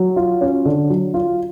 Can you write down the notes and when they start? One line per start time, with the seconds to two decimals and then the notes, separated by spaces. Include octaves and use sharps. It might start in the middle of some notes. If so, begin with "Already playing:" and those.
Already playing: F#3
0.16 F4
0.41 C#4
0.65 D3
0.90 F#3
1.14 F4